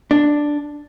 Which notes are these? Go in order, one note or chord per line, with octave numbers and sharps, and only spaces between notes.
D4